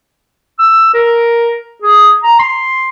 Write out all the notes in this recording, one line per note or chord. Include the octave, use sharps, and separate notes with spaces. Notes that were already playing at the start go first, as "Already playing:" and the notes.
E6
A#4
G#4
A#5
C6